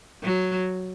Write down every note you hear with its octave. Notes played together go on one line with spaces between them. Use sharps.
F#3